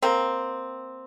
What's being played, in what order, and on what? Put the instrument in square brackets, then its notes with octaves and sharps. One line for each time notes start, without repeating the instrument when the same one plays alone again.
[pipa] A#3 C4